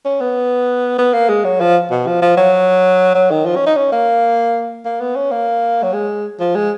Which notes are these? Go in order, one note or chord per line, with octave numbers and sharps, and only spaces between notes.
C#4
B3
B3
A#3
G#3
F#3
F3
B2
F3
F3
F#3
F#3
D#3
F3
C#4
D#4
C#4
A#3
A#3
B3
C#4
A#3
F#3
G#3
F3
G#3